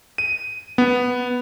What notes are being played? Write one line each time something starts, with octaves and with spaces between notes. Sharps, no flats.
D#7
B3